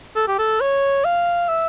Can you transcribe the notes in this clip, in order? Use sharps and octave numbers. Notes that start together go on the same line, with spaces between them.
A4
G4
A4
C#5
F5
E5